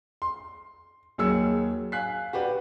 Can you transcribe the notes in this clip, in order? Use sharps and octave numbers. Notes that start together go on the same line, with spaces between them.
C6
D#2 F#3 G#4 E6 C#7
F5 G#5 F#6 B6 C7
F#4 G4 B4 D5